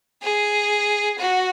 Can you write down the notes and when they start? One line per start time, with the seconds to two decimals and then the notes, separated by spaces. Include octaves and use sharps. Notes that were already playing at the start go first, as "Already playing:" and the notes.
0.22 G#4
1.19 F#4